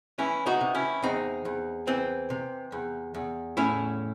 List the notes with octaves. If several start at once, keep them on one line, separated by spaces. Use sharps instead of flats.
E3 C#4 E4
D#4 F#4
C3
C#4 E4
E2 C4 D#4
E2
E3 C4
C3
E2
E2
A2 C#4 E4